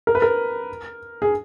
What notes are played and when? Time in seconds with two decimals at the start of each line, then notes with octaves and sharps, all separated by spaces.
0.07 A#4
0.15 B4
0.22 A#4
1.22 G#4